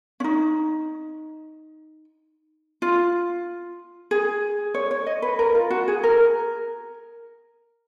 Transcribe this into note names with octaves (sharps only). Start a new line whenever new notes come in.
C#4
D#4
F4
G#4
C#5
C#5
D#5
B4
A#4
F4
F#4
G#4
A#4